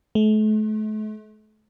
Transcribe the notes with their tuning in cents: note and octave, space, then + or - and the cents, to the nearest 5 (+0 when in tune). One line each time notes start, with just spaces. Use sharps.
A3 -40